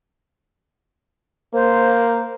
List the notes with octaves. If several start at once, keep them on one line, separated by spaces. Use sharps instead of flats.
A#3 C5